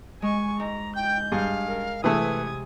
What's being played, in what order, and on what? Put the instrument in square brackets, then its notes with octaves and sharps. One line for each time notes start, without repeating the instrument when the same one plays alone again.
[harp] G#3 [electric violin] G#5 C#6
[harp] G#2 [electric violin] A#5
[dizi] G5 [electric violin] G6
[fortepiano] G2 [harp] G#4 [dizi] F5
[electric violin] A#4
[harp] C3 G#4 E6 [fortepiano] E3 A3 [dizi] B4 [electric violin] D#6 G#6